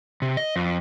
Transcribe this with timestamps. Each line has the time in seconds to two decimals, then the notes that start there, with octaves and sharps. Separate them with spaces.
0.22 C3
0.37 D#5
0.56 F2